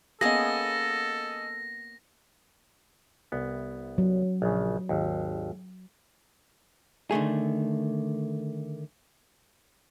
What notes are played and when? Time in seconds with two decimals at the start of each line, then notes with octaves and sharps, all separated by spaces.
0.21 A#3 B3 C#4 G#4 A4 D#5 A#6
3.32 C2 B3
3.98 F#3
4.42 A#1 C#3
4.89 G#1 D#2
7.11 D3 D#3 A3 G#4